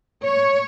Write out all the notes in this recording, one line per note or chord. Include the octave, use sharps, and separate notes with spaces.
C#5